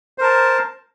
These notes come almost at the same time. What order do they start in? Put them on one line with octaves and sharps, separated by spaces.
C5 A#4 A5